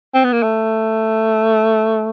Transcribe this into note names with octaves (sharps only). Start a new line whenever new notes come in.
C4
B3
A#3
A3